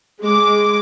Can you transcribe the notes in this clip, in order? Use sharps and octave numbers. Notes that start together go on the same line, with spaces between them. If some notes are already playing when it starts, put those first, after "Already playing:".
G#3 D6